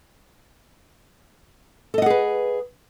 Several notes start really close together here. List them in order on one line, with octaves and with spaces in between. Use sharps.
A4 D#5 F#5 G#4 B4